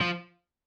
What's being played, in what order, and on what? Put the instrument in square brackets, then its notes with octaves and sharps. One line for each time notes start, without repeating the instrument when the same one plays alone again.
[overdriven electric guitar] F3